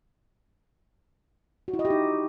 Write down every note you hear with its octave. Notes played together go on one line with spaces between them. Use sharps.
F#4
E4
D#5
G4
D#4